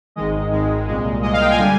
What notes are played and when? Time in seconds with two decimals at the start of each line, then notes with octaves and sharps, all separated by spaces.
0.16 G#1 G#2 D#3 G#3 D#5
0.51 G#1 G#2 D#3 G#3
0.88 C2 A#2 G#3
1.23 C2 A#2 G#3 D#5
1.33 F5
1.41 G5
1.50 G#5
1.59 D3 G3